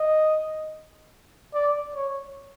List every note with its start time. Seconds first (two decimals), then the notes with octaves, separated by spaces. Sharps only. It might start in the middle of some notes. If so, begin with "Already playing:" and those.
Already playing: D#5
1.54 D5
1.95 C#5